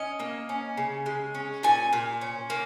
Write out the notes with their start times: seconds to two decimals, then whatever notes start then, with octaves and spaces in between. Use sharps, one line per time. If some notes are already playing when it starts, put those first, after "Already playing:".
Already playing: C#4 D#5
0.20 A#3
0.49 C#4
0.77 C#3
1.06 G#3
1.35 C#4
1.63 A#2 G#5
1.93 A#2
2.21 C#4
2.50 A#3